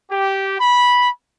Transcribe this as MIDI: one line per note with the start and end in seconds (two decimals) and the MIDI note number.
0.10 0.55 67
0.60 1.09 83